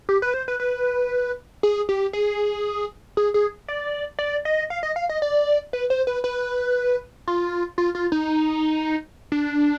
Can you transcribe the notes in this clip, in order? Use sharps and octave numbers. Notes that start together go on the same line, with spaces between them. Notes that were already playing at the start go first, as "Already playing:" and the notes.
G4
B4
C5
B4
B4
G#4
G4
G#4
G#4
G#4
D5
D5
D#5
F5
D#5
F5
D#5
D5
B4
C5
B4
B4
F4
F4
F4
D#4
D4